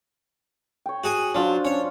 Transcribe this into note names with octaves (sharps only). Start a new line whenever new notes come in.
C#5 G5
F#4 G#4 G#5
F#3 D4 F4 C5
C#4 C#5